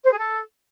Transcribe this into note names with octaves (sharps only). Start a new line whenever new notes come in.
C5
G#4
A4